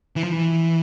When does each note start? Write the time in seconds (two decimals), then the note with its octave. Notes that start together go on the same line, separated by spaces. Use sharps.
0.16 E3
0.24 F3
0.32 E3